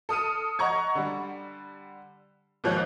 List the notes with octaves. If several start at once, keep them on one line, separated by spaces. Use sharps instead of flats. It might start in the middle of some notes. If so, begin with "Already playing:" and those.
A4 D#6 F6 D#7
D#5 F#5 A#5 C#6 G#6
D3 G3
D#2 G#2 F3 C#5 F#6